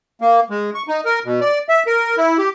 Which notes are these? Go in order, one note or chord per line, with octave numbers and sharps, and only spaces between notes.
A#3
G#3
C#6
D#4
A#4
B2
D5
E5
A#4
E4
G4